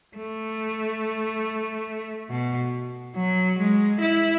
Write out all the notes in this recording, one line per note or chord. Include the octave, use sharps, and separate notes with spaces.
A3
B2
F#3
G#3
E4